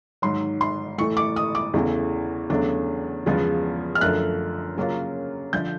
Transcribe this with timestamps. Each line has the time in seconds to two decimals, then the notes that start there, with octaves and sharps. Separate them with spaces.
0.22 G#2 D#3 F#3 C6
0.61 C6
0.98 A2 E3 A3 C#6
1.17 D6
1.36 D#6
1.55 D6
1.74 E2 C#3 E3 A3
2.50 E2 C#3 F#3 A3 D4
3.26 E2 C#3 F3 G#3 B3
3.95 F6
4.01 F#2 D3 F3 A3 F#6
4.77 C#3 F#3 A#3 C#4 F4
5.53 D3 F3 G6